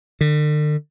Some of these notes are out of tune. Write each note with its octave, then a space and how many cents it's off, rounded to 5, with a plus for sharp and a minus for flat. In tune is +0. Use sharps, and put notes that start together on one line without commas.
D3 +40